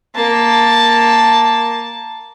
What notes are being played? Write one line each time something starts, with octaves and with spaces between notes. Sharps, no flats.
A#3 A5